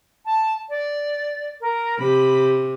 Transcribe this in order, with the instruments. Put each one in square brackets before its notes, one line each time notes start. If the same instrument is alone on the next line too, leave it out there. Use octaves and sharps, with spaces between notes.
[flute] A5
D5
A#4
[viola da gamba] C3 [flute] B5